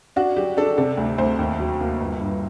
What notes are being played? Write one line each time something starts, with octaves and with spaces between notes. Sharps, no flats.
D4 F#4
F#3 G4
D4 A4
C3 A4
D2
D2 C5
D#2
F#3
A#3
G1
G2